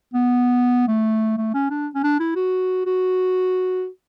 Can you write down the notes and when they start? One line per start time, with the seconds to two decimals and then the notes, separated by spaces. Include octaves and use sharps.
0.14 B3
0.88 A3
1.37 A3
1.54 C#4
1.70 D4
1.95 C#4
2.03 D4
2.19 E4
2.36 F#4
2.86 F#4